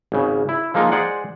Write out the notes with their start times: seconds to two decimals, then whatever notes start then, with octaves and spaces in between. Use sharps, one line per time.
0.12 G#1 C#3
0.49 E4
0.74 F3 G#3 A#3 D#4 F4
0.92 G#3 G#4 C5 D5 F#5